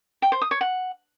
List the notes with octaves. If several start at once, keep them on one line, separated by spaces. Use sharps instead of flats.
G5
C5
D#6
C#5
F#5